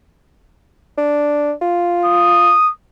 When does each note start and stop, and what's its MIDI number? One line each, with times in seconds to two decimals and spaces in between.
0.98 1.53 62
1.62 2.54 65
2.05 2.71 87